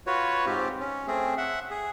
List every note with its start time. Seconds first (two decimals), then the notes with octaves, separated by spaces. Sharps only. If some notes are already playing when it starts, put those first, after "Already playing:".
0.07 F4 F#4 B4 C#5
0.46 G#2 C4 F4 G4
0.80 C#4
1.07 A3 C4 G#4
1.37 E5 F#5
1.71 G#4